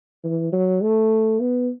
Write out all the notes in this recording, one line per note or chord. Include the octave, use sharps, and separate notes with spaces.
E3
F#3
A3
B3